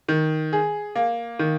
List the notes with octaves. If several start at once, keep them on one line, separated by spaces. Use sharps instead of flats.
D#3
G#4
A#3
D#3